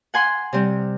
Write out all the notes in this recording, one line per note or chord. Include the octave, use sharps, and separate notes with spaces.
F#5 G#5 C6
C3 G3 C4